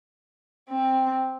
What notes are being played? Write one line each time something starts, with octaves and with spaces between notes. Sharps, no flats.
C4